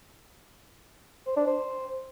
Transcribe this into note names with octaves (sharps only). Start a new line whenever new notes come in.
C5
D4
C5